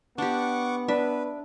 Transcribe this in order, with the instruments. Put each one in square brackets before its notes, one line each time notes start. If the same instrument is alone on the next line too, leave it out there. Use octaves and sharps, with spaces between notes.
[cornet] B3 [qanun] D4 G4 [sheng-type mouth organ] F#5 C#6 D6
[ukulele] D4 [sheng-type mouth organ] B4 [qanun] E5